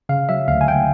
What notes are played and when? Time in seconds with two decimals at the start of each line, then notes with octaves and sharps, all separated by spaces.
0.09 C#3 F5
0.29 F#3 E5
0.48 D2 F5
0.61 G#5
0.68 D2 G5